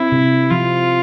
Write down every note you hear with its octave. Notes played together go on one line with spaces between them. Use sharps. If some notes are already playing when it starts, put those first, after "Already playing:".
Already playing: C4 E4
C3
F3 F4